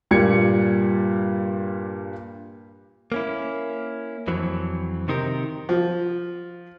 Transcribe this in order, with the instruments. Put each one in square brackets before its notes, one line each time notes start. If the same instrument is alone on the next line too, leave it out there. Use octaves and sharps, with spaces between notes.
[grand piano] G2 A#2 G3 G#6 C#7
[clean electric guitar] A#3 C#4 E4
F2 E3 F#3 C4
C3 D#3 C4 D#4 G4 A#4
[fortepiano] F3